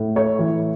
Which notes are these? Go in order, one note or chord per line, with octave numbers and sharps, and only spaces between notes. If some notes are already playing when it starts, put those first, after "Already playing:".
Already playing: A2
A3 C#5
E3